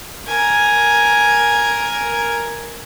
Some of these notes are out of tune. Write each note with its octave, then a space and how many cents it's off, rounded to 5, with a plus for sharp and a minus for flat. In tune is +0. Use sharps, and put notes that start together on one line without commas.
A#4 +10 G#5 +0